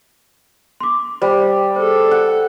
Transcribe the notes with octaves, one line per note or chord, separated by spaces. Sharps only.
C6 D6
G3 C5
G#4 A4 C5
F#5